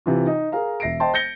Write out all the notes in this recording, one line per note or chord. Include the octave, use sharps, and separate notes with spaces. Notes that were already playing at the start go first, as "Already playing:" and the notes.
C3 E3 F4
D#4
G#4 A#4 F5 A#5
E1 E5 A#6 C7 D7
C5 D#5 G5 A5 C6
G6 A6 A#6 C#7 G7